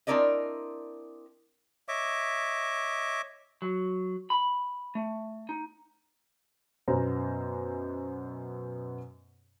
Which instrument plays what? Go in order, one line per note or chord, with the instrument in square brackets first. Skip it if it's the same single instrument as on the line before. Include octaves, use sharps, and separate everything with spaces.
[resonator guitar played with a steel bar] C4 D4 E4 A#4 D5 D#5
[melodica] C#5 D#5 E5 D6
[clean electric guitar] F#3
B5
A3
D#4
[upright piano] F#2 B2 B3 C#4 C5 A#5